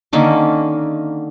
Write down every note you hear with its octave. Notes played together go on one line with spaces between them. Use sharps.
D3 D#3 A#3 C#4